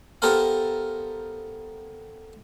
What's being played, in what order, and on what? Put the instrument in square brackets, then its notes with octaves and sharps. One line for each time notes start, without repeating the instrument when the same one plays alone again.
[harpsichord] B3 G4 A4 A#4 C5 F5